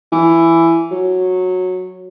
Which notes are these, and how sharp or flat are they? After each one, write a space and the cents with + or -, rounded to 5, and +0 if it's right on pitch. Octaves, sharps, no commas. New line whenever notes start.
E3 +10
F#3 -10